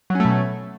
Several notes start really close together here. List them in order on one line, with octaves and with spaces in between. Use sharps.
F#3 C#4 A3 B2